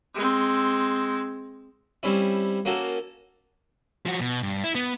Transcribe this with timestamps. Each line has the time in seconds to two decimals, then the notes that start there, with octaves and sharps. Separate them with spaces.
0.15 G#3 C4
2.03 G3 C4 C#4 E4
2.65 A#3 C#4 F#4 A4
4.06 F3 F#4
4.21 B2
4.43 G2
4.64 E4
4.75 B3